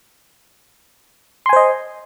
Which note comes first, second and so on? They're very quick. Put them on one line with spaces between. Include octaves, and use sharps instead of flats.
C6 G#5 C5 D#5